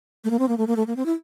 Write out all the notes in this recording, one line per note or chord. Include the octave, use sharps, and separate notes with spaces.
A3
A#3
C4
A#3
A3
A#3
A3
A#3
C4
E4